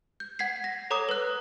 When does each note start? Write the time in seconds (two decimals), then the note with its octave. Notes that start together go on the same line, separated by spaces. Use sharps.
0.20 G6
0.39 F#5 G#6 B6 C7
0.64 A#6
0.90 A4 C#5 A#5 D6 D#6
1.09 B4 F#6